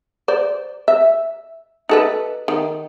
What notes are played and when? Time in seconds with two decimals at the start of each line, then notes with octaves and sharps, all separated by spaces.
0.28 C5 D5
0.88 E5
1.89 D#4 A4 B4
2.48 D#3